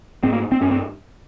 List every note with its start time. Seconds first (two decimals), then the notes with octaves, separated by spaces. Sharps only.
0.23 G#2 C4
0.33 A#3
0.52 C4
0.61 G2 C#4
0.71 C4